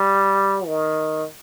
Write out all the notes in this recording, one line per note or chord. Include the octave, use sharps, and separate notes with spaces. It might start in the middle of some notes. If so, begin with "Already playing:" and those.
Already playing: G3
D#3